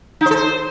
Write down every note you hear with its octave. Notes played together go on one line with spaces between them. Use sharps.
D#4
C5
A4
C5